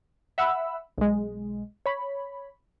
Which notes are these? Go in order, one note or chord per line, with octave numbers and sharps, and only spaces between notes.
E5 F#5 B5 E6
B1 G#3
C#5 B5